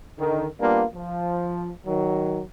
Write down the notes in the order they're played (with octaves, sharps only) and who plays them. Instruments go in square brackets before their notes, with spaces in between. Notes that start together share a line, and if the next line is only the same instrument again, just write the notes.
[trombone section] D3 D#3
G3 A#3 B3 D4 F4
F3
D#3 F#3